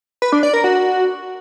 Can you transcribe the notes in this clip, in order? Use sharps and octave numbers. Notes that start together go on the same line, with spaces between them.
B4
D4
D5
A#4
F#4